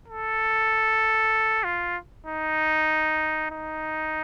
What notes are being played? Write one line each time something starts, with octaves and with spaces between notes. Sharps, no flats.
A4
F4
D#4
D#4